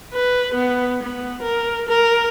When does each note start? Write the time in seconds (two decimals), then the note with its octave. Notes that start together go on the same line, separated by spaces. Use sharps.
0.14 B4
0.54 B3
1.03 B3
1.42 A#4
1.89 A#4